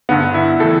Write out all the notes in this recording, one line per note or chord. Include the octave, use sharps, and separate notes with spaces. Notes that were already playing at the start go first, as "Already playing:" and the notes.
G2 D3 B3
E4
A2 E3 A4